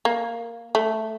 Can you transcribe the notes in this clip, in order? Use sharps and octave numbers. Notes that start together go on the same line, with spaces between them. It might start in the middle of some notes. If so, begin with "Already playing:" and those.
A#3
A3